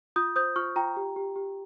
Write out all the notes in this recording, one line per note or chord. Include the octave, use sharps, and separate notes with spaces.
F4 D#6 G6
C5 D#6 G6
F4 C#6 F6
F4 G5 A#5
G4
G4
G4